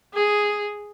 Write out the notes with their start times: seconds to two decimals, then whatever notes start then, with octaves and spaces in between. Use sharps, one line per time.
0.14 G#4